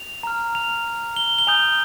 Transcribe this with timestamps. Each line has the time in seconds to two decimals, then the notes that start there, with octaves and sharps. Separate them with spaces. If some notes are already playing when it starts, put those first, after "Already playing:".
Already playing: F7
0.23 A#5 F6
0.55 F7
1.16 G7
1.39 G7
1.47 G#5 D#6 G6 F7